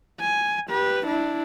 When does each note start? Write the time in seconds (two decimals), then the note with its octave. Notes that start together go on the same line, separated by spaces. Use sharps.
0.21 G#5
0.69 G4 B4
1.06 D4 E4